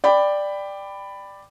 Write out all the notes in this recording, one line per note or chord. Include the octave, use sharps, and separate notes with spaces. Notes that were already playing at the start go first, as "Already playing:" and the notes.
D5 G5 B5